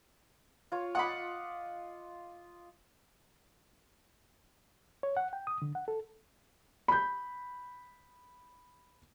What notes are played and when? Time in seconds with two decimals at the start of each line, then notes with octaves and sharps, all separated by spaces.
0.72 F4 C#5
0.95 F4 D#5 F#5 B5 D6
5.03 C#5
5.17 F#5
5.33 G5
5.47 D#6
5.62 D3
5.75 F#5
5.88 A4
6.88 B5 G6